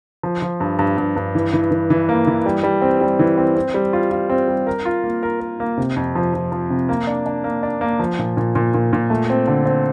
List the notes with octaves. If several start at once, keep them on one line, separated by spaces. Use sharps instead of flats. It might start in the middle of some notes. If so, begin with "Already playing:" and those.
F3
F3
G2
G2
G2
G2
E3
E3
E3
E3
A#3
E3
G3
G3
C4
G3
E3
C4
C4
G3
F4
F4
C4
G3
A#4
F4
A#3
A#4
A#4
A#3
C3
F2
F3
F3
F3
C3
A#3
D4
D4
A#3
D4
A#3
F3
A#2
A#2
A#2
A#2
A#2
A3
C4
D3
C4